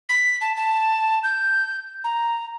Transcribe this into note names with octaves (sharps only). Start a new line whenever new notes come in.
B6
A5
A5
G6
A#5